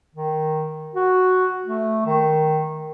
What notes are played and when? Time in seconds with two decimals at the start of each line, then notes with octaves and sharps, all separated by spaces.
0.15 D#3
0.95 F#4
1.66 A3
2.06 D#3